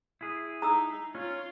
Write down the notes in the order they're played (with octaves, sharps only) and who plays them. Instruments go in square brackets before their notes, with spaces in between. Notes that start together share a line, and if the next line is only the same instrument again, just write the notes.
[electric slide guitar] E4 G#4
[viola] D#4 [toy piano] A#5 D#6 E6
[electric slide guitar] C#4 [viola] F4